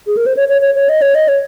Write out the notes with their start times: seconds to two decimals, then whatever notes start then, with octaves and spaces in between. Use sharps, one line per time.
0.07 G#4
0.17 A#4
0.26 C5
0.37 C#5
0.49 C#5
0.62 C#5
0.75 C#5
0.89 D#5
1.02 C#5
1.15 D#5
1.28 C#5